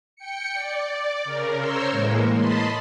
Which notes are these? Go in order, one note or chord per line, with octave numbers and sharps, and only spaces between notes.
G5 C#7
D5
C#3 A#4
C5 C#5 A#5 C6 E6
A2 E3 G#3 A#3
D#5 A5 B5 C6